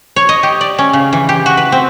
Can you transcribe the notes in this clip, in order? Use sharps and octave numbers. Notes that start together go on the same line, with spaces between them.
C#5
D#5
G4
D5
C#4
C#3
E3
G4
F#4
B4
C4